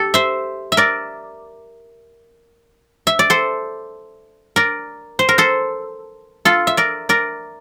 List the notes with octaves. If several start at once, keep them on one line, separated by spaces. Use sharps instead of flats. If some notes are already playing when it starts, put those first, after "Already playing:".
Already playing: G4 A4
C5 E5
E5
A#4 D5
E5
D5
A4 C5
A#4 D5
C5
A#4
A4 C5
F4 A4
E5
A#4 D5
A#4 D5